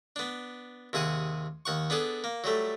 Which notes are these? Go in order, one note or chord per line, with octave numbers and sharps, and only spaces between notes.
B3 D4
D#2 C3 G#4 F#5 D#6
D#2 F#5 C#6
B3 D4 G#4 A4
A#3
F#3 G3 A3